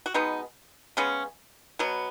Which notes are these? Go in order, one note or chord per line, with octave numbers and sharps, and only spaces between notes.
F#4
B2 G#3 B3 D#4
C#3 G#3 B3 C#4
B2 F#3 B3